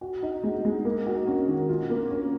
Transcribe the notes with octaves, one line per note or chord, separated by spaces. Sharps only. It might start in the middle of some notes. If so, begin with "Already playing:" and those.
F#4
D#4
G#3
G#3
A#3
F#4
C#4
D#3
F4
A#3
C#4